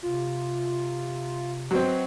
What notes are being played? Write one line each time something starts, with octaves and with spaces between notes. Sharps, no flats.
C3 F4
F#3 C4 B4 D#5 C6